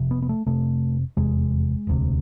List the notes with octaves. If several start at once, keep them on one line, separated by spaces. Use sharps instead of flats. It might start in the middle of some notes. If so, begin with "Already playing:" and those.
Already playing: F1 F2 C3
B3
B3
A3
F1 E2 C3 A3
F1 E2 C3 G#3
E1 D2 C3